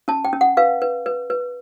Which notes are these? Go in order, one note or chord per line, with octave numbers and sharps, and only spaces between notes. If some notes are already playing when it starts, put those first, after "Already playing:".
C#4 A5
G5
C#4
F#5
B4 F5
B4
B4
B4